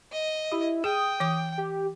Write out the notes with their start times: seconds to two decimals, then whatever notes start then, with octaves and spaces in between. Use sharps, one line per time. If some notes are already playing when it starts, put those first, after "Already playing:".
0.12 D#5
0.52 E4 G4
0.84 G#4 G5 D#6
1.20 E3 D6
1.58 G4